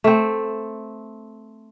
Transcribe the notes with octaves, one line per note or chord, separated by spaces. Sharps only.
A3 C4